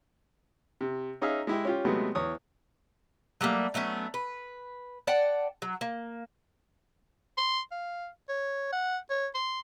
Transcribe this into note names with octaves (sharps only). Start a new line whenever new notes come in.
C3
C#4 D#4 G#4 E5 F5
G#3 E4 G4
C#4 F4 G4
C3 F#3 G#3 A3 B3
E2 C#5 D#6
F#3 G3 A3 A#3
F#3 A3 B3 C#4
B4
D5 F#5 G5 A5
F#3
A#3
C6
F5
C#5
F#5
C#5
C6